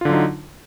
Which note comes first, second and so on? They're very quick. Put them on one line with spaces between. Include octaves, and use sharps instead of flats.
F4 D3 F#3 D#4